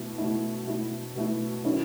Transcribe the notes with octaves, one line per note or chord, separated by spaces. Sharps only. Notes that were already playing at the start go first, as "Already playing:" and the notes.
Already playing: B2 A3 E4
B2 A3 E4
B2 A3 E4
B2 A3 E4
D#3 F#3 C#4 E4